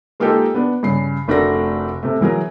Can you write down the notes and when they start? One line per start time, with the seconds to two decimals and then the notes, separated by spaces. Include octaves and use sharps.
0.20 G#3 A#3 D#4 F4 G4 A4
0.54 B3 D4
0.83 G2 C#3 C7
1.28 F1 A3 D4 F#4 A#4 A#6
2.03 C3 A3
2.21 E3 F#3 G#4 A#4